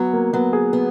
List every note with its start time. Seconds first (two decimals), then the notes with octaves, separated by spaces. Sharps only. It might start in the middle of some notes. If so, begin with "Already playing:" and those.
Already playing: F#3 B3
0.13 A#3
0.33 F#3 B3
0.53 G#4
0.73 B3